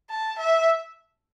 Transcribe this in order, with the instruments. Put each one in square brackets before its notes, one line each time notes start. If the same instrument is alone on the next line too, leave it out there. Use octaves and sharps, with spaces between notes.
[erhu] A5
E5